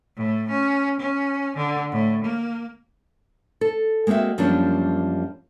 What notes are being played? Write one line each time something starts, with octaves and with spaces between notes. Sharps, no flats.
A2
C#4
C#4
D3
A2
A#3
A4
G#3 A#3 C4 F#4 E5
F#2 F3 G3 A#3 C#4 D4